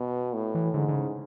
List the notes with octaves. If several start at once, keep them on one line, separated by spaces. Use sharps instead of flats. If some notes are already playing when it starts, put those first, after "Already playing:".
Already playing: B2
A2
E3
G#2 D3
D3
C#3